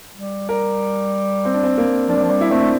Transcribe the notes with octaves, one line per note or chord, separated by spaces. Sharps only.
G3
G3 A#4
C4
D4
C4
A#3
F3 D4
G3
F3
G3
E4
A3 C4
D4